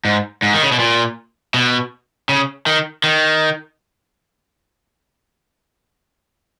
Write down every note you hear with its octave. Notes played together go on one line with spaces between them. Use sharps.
G#2
G#2
D#3
C#3
B2
A#2
B2
C#3
D#3
D#3